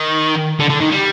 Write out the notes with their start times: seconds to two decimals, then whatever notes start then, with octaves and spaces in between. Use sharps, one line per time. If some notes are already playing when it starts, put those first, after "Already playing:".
Already playing: D#3
0.59 D3
0.70 D3
0.81 D#3
0.92 G3